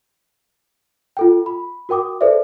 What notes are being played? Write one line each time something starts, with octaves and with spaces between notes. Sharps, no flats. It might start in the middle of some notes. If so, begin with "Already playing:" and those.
F4 A4 G5
B5
F#4 A#4 G5 D6 D#6
G#4 A4 B4 C5 D5 E5